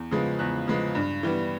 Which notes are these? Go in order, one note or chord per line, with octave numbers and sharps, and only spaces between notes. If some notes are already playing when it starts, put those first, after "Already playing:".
Already playing: E2
C#3 F3 G#3 B3
E2 F#6
C#3 F3 G#3 B3
G2
E3 G3 B3